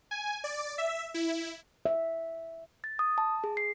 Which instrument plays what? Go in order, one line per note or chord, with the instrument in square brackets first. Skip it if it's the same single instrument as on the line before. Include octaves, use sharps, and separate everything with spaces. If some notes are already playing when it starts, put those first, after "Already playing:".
[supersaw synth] G#5
D5
E5
E4
[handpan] E5
[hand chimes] A6
D#6
A5
G#4
C7